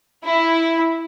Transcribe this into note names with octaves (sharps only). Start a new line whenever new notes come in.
E4